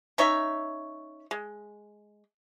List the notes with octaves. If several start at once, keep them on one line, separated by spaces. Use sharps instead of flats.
C#4 D#4 C#5 E5
G#3